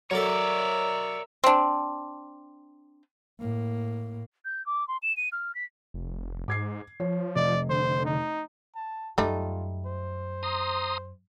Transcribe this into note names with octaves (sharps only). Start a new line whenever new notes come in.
F#3 A4 A#4 C#5 D5 E5
C4 D4
A2 A#3
G6
D6
C6
E7
D#7
F6
B6
F1
G#2 D6 G#6 C7
F3 C#5
F1 D5 D#5
D3 C5
D#4
A5
F#2 G3 A3 D#4 F4
C5
A#5 C6 D#6